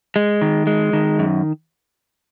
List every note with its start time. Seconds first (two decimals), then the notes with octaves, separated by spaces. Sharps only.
0.16 G#3
0.42 D#3
0.67 G#3
0.93 D#3
1.19 F#2